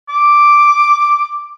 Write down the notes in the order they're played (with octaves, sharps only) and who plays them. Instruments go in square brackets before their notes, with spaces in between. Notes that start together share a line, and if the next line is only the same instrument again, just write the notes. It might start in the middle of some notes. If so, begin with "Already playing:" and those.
[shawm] D6